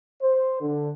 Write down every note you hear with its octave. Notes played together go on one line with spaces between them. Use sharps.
C5
D3